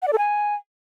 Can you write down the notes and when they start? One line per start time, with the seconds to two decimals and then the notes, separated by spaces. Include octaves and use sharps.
0.02 F#5
0.08 D5
0.13 A4
0.18 G#5